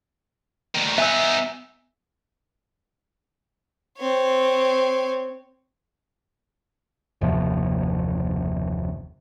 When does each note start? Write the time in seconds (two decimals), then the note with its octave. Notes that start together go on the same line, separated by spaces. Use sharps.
0.75 D2 D#3
0.98 B3 D#4 E5 G#5 E6
3.98 C4 C#5
7.21 F#1 D#2 C3 F3